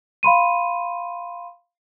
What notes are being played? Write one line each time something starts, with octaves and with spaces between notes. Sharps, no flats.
F5 B5 C6 D#7